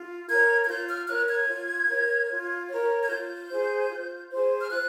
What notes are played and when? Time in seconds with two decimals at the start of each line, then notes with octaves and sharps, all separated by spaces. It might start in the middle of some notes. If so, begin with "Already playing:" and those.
Already playing: F4
0.28 A#4 C#5 G#6
0.63 G#6
0.68 F4 G6
0.88 F6
1.08 A#4 C#5 F#6
1.28 G#6
1.48 F4
1.88 A#4 C#5
2.29 F4
2.69 A#4 C#5
3.02 G#6
3.09 F4 G6
3.50 G#4 C5
3.90 F4
4.30 G#4 C5
4.61 F6
4.70 F4 F#6